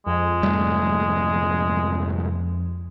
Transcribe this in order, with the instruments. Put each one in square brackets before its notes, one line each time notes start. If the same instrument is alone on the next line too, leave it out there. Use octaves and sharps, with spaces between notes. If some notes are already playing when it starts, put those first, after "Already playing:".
[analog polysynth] F2 [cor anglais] G#3
[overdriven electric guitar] C2 G#2 [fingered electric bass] G3 A3